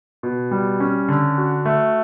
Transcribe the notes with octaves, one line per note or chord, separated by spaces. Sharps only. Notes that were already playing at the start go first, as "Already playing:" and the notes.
B2
G3
C#4
D3
F#4
A3